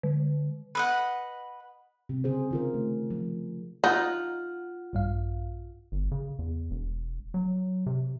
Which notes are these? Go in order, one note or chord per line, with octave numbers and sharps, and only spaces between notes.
D3
B4 D#5 F#5
C3
C#3 G#4 C5
D#3 F4 A#4
A3
F3
D#4 F4 F#5
A#1 G2 F5
G1
C#3
E2
E1
F#3
C3